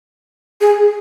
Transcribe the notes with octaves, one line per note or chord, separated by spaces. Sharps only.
G#4